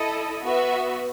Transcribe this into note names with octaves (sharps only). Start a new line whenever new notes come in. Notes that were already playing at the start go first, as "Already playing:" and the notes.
Already playing: E4 A4 D#5
B3 F#4 B4 E5